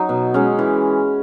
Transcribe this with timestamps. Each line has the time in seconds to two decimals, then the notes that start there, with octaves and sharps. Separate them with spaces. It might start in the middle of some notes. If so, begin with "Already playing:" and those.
Already playing: F#3 D#4
0.09 B2
0.34 G#3 C#4
0.59 E3